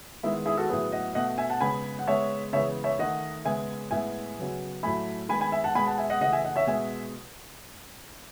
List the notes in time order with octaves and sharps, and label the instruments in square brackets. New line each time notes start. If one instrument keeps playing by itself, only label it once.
[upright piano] D#3 G#3 B3 E4
E4 G#4
F#4 A4
A2 F#3 B3 G#4 B4
D#5 F#5
B2 A3 D#5 F#5
E5 G#5
F#5 A5
C#3 G#3 B3 G#5 B5
F#5
C#3 G#3 B3 C#5 E5
C#3 E3 G#3 B3 C#5 E5
C#5 E5
D#3 A3 D#5 F#5
C#3 G#3 B3 E5 G#5
A2 G#3 B3 E5 G#5
C#3 F#3 B3
A2 F#3 A3 G#5 B5
D#3 G#3 B3 G#5 B5
G#5 B5
E5 G#5
F#5 A5
B2 G#3 B3 G#5 B5
F#5 A5
E5 G#5
D#5 F#5
C#3 E3 A3 D#5 F#5
E5 G#5
D#5 F#5
C#5 E5
B2 G#3 B3 E5 G#5